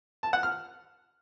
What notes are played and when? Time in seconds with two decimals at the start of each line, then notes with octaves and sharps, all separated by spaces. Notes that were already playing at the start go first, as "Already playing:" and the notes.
0.23 A5
0.33 F#5
0.43 F6